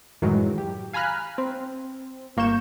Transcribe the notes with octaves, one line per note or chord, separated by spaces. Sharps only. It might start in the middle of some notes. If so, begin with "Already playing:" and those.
F#2 A2 D#3 E3 F#3 G#3
G4
F5 G#5 A#5 B5 F6 F#6
C4
G1 A#3 C#6 G6 E7